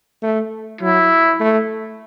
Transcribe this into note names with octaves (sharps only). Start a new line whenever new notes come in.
A3
F#3 E4
A3